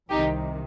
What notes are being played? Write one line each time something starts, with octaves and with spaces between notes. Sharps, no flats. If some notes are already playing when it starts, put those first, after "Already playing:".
C2 C3 D#3 D#4 G4